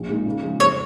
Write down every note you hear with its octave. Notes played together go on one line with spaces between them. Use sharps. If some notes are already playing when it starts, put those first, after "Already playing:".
Already playing: A#1
A#2 G#3 D#4
C#3
F3 G#3
F2 C#5